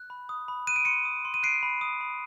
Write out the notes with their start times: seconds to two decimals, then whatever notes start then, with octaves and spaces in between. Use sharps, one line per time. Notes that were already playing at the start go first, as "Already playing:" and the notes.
Already playing: F#6
0.10 B5
0.29 D#6
0.48 B5
0.67 F#6 D#7
0.76 D7
0.85 C6 C#7 D#7
1.05 D#6
1.25 C6
1.34 D#7
1.43 F#6 C7 D7
1.63 B5
1.81 D#6
2.01 B5